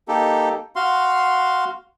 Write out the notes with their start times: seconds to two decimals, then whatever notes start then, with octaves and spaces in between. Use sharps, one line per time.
0.08 A#3 D#4 G4 A4
0.76 F#4 F5 C6